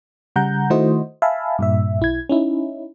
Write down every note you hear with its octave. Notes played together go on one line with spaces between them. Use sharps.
C#3 G3 F#5 A#5 G6
D#3 A3 E4 F#4 C5 D#5
E5 F5 G#5 A5 B5
G2 A#2 E5
B1 E4 G#6
C#4 D#4 E4